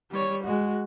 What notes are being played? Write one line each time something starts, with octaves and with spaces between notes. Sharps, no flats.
G3 C#5
G#3 F#4